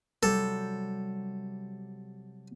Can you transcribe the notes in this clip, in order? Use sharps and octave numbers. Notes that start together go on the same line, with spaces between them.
C3 F#3 G3 A4